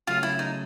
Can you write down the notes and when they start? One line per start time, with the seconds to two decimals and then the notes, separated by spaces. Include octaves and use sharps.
0.07 C#3 F#3 A3 F4
0.23 E4
0.39 D#4